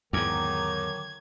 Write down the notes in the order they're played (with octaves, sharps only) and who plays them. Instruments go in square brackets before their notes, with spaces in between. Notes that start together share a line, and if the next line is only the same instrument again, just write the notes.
[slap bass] E2 G#2 [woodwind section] D3 D#3 F#3 [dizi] D6 [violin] G#6